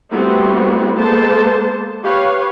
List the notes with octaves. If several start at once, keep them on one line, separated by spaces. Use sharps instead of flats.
G3 A3 B3 C4 E4 F#4
G#3 A#3 B3 A4 C5 A5
G4 B4 C#5 F5